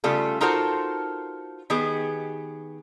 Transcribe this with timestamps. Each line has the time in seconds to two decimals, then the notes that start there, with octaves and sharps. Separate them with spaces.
0.04 C#3 G3 A3 F4 A4
0.41 D#4 F4 F#4 A4 A#4 C5
1.70 D#3 B3 G4 G#4